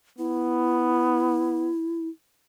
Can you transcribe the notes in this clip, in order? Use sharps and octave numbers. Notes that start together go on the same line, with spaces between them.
B3 E4